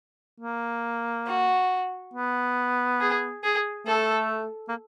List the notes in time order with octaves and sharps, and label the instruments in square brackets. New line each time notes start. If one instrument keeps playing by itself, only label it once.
[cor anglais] A#3
[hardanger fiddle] F#4
[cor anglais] B3
[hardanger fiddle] G#4
G#4
[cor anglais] A3 [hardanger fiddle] A4
[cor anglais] A#3